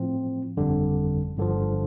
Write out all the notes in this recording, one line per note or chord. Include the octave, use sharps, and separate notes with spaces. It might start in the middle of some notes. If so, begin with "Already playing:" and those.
Already playing: A2 F3 C4
G1 F2 D3 G3
G1 G2 D3 F3